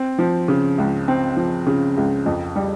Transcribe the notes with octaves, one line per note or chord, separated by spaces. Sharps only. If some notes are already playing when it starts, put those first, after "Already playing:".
Already playing: C4
F3
C#3
C#2
C4
F3
C#3
C#2
F2
G3